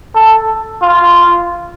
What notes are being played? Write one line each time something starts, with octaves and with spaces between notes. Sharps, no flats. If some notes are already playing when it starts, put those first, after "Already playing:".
A4
F4